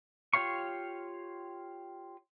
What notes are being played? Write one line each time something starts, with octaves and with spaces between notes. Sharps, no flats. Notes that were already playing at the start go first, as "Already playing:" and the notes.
F4 G4 C#5 F5 C#6